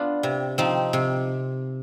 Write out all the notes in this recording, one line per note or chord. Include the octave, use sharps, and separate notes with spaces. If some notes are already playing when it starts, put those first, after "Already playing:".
Already playing: B3 D4 F4
C3
F3 C4 D#4
C3